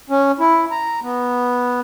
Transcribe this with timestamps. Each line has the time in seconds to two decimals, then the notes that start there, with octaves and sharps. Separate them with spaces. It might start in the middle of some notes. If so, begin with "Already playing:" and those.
0.10 C#4
0.40 E4
0.71 A#5
1.02 B3